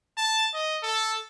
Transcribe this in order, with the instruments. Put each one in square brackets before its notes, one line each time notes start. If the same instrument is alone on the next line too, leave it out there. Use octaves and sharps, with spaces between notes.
[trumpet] A5
D#5
A4